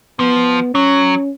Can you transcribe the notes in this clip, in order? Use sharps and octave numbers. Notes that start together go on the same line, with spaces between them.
F3 B3
F#3 C#4